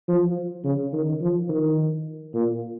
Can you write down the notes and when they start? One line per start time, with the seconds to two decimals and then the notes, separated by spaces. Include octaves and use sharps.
0.08 F3
0.64 C#3
0.93 D#3
1.21 F3
1.49 D#3
2.34 A#2